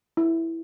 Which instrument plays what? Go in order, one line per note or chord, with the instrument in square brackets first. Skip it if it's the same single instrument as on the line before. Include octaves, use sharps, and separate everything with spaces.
[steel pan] E4